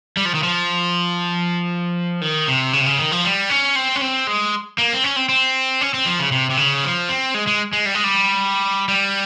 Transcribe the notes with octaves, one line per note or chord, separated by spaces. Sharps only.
G3
F3
D#3
F3
D#3
C3
C#3
C3
C#3
D#3
F3
G3
C#4
C4
C#4
C4
G#3
A#3
C4
C#4
C4
C4
C#4
C4
F3
C#3
C3
C3
C#3
F3
C4
G#3
G#3
G#3
G3
G#3
G3
G3